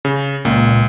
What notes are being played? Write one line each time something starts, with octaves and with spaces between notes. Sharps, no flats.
C#3
C#2 A#2